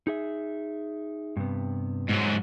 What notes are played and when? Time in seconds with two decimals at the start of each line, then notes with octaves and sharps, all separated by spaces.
0.07 D#4 G#4 E5
1.37 G2 C3 B3
2.09 G#2 F#3